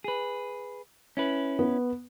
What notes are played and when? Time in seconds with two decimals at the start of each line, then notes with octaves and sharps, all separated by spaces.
0.04 G#4 B4
1.17 C#4 E4 B4
1.59 B3